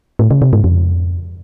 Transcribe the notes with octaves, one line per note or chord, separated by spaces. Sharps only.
A2
C#3
C3
G#2
F2